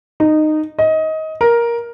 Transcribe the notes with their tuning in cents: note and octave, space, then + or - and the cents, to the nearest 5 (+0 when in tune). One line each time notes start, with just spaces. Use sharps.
D#4 -15
D#5 +20
A#4 +10